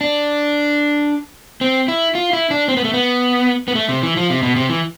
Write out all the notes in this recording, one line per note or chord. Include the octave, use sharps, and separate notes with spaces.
D4
C4
E4
F4
E4
D4
C4
B3
A3
B3
B3
A3
C3
E3
F3
C3
B2
C3
E3